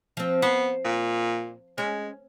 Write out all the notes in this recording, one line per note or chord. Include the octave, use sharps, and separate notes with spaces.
F3 C4
B3 C5
A#2
G#3 C#4